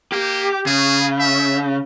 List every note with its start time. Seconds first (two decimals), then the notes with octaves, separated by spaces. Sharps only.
0.12 A#3 G4
0.66 C#3 G#4
1.19 E5